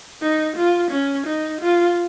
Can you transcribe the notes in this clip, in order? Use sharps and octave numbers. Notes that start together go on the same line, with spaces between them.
D#4
F4
C#4
D#4
F4